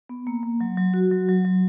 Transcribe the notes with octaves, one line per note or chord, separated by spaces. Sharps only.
B3
A#3
A#3
F#3
F#3
F#4
F#3
F#3
F#3